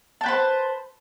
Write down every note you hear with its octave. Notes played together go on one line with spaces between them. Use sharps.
B4 C5 G5 A5